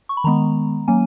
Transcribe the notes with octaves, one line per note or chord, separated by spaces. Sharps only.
C#6
B5
D#3 G#3 B3 A#5
F#3 A#3 C#4 G#5